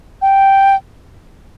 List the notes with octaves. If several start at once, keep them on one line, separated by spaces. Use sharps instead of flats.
G5